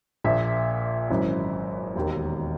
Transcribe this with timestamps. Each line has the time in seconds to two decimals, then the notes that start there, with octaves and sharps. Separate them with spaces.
0.24 A#1 A#2 E5
1.10 G#1 F#2 E3
1.95 E1 D#2 D#3